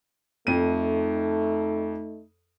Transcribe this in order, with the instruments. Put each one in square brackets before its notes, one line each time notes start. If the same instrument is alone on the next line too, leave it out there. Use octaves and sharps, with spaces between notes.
[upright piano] F2 D#7 [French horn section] A3 D#4